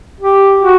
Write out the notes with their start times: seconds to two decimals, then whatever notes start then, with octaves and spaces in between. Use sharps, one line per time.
0.21 G4
0.62 F#4